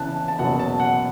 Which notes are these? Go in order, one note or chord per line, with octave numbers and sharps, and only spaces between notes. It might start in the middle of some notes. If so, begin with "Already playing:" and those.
Already playing: E2 C#3 E3 A5 F#6
A5
F#1 E2 B2 F#3 F#5
A5
F#5